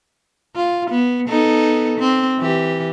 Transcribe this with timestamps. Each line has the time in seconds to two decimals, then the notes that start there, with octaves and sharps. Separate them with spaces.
0.56 F4
0.91 B3
1.28 B3 D#4 A4
1.98 C4
2.39 E3 G4